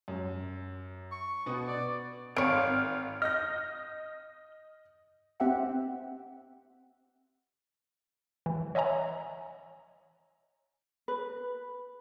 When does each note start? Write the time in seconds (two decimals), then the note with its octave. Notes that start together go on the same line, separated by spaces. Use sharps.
0.08 F#2
1.12 C#6
1.46 B2 B3
1.68 D5
2.36 G#1 C4 C#5 F5 D7
3.22 D#5 F6 G6 A#6
5.40 C4 G4 E5 F#5
8.46 E3
8.75 C#5 D#5 E5 G#5 A#5
11.08 B4